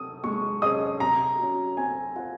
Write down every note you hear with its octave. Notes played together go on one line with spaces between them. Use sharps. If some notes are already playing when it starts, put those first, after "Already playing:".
Already playing: D#6
G#3 C#6
C#4 G#4 C5 D#5 D#6
C3 A#5
F#3 C#4 F#4
C4 G#5
F4 C5 F5 F#5